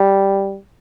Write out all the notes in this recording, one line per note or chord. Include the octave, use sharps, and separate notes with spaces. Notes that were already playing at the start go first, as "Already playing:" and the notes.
Already playing: G3